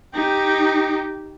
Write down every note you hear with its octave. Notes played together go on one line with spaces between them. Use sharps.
D#4 G4